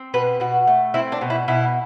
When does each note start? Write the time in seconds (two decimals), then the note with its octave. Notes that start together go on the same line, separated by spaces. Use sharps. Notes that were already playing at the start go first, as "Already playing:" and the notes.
Already playing: C4
0.14 B2 B4
0.40 B2 F#4
0.67 A3
0.94 C4 E4
1.12 D4
1.21 B2
1.30 E4
1.48 B2 E4